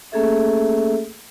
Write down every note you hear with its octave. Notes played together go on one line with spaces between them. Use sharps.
A3 A#3 C#4 G#4 A4 E5